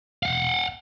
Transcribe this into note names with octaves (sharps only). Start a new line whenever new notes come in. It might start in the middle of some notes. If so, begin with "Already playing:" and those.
F5 F#5